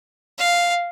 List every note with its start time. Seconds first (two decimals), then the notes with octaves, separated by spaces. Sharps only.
0.39 F5